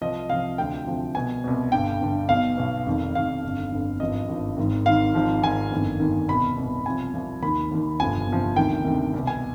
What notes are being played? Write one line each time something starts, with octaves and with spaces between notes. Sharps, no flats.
C2 C3 F3 D#5
C2 C3 F3 F5
D2 C3 F3 G5
D2 C3 F3
C2 B2 G#5
C2 B2
G1 G2 D3 G5
G1 G2 D3
B1 B2 F5
B1 B2
F1 F2 D#3
F1 F2 D#3 F5
G1 F2 D3
G1 F2 D3
G#1 G2 F3 D#5
G#1 G2 F3
G#1 G#2 D#3
G#1 G#2 D#3 F5
G#1 G#2 F3
G#1 G#2 F3 G#5
G1 F2 D#3
G1 F2 D#3
C2 B2 B5
C2 B2
C2 C3 F3 G#5
C2 C3 F3
D#2 D#3 B5
D#2 D#3
G1 F2 C3 F3 G#5
G1 F2 C3 F3
D2 C3 D#3 G5
D2 C3 D#3
C2
B2
G#5